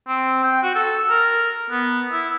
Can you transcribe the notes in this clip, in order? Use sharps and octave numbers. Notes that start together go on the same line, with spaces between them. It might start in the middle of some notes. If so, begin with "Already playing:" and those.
C4
G5
F#4
A4
A#4
B3
E4